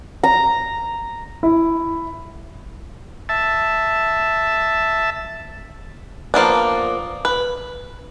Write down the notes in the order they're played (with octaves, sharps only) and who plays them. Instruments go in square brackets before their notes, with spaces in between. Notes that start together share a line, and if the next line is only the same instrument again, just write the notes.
[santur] A#5
[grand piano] E4
[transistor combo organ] E5 A5
[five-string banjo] F3 A#3 B3 D4
B4